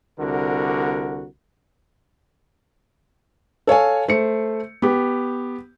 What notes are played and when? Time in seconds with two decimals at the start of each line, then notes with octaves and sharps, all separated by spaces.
0.19 C2 D3 F#4 A#4
3.67 A4 C#5 F5 G#5
4.09 A3 C5 C#7
4.82 B3 G4